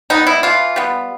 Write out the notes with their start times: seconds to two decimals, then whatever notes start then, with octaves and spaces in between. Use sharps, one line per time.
0.10 G3 B3 D#4
0.27 E4
0.43 E3 F4
0.76 G3 B3